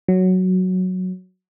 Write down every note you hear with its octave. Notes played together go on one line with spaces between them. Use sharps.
F#3